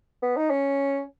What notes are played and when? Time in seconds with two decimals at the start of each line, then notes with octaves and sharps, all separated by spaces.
0.22 B3
0.36 D#4
0.50 C#4